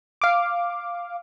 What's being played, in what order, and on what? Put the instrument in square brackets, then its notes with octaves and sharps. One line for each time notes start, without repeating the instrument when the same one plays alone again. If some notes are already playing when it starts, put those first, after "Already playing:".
[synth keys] F5 D6